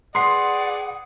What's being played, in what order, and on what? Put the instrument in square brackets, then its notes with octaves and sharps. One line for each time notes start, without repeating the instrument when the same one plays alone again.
[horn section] G#4 B4 D5 [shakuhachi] F#5 [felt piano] C6 C7